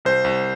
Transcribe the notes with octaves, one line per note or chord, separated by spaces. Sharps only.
C2 C5
C2